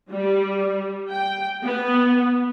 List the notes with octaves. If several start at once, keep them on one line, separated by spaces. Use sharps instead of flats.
G3
G5
B3